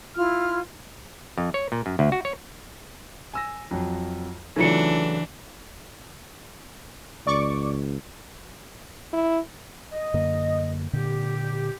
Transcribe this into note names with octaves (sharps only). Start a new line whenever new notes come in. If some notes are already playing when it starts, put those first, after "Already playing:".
E4 F4 F6
F2
C#5
A#2
F#2
D2
F#4
C#5
G#5 E6 A#6
F2 F#3
C#3 E3 F#3 A3 D4 D#4 F4 C#7
C#2 D5 C#6 D6
E4
D#5
F#2 D3 A#3
A#2 D3 G4